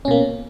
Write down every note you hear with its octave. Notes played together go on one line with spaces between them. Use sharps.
B2 A#3 C#4